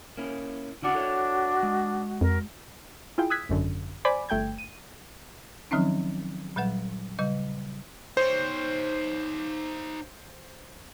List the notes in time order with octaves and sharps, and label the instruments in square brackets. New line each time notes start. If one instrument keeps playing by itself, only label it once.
[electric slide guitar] A#3 C#4 E4
[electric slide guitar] C#3 E4 F#5 [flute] D4 [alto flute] F#4
[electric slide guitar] A4 C#5 E5
G#3
[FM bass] F2 [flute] A#4
[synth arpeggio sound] E4 F4 G#4 G5
D#6 E6 F#6 G#6 B6
G#1 F#2 D3
C5 D5 G#5 B5 D6
G1 A3 G5 G6 G#6
D#7
[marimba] D#3 F3 F#3 C4 C#4 D#4
A#2 F#3 G3 B4 F#5
C#3 G3 D#5
[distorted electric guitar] D#4 C#5 [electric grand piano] C5